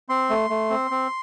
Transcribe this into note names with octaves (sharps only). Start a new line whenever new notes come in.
C4 C6
A3
A3
C4
C4